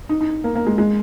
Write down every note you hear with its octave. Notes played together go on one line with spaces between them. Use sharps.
D#4
D#4
A#3
A#3
G#3
G#3